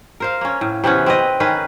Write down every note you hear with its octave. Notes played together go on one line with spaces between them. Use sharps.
A#4 C5 F5
A#3 C#4
A2
C3 E3 B3 C#4
C4 B4 D#5
D#3 C#4 G#4 B4